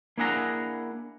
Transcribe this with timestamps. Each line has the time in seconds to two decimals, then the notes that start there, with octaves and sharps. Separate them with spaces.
0.18 A#3 D4 E4 G#4 F#5 A#5